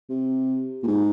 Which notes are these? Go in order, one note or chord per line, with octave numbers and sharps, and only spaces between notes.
C3
A#2
G#2